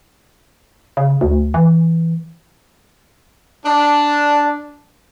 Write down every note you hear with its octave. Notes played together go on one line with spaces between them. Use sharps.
C#3
D2
E3
D4